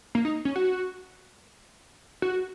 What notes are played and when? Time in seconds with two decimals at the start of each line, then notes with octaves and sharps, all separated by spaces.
0.15 A#3
0.25 D#4
0.45 C#4
0.56 F#4
2.22 F#4